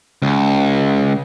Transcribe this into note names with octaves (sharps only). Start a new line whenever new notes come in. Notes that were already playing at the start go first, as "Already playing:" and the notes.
C#2